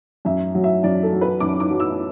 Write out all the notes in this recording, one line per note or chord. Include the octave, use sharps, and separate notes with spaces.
F#2 E5
F#3
E5
F#2 D5
A4
F#3
B4
F#2 D6
D6
F#3
E6